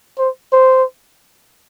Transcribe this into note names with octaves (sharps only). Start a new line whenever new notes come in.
C5
C5